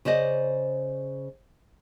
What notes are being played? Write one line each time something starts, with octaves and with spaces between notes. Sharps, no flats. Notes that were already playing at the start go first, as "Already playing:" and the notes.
C#3 C5 D5 D#5